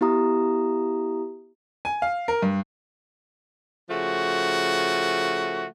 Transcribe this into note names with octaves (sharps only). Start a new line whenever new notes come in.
B3 E4 G4 E5 A#5 D#6
G#5
F5
A#4
G2
C#3 F3 A3 F#4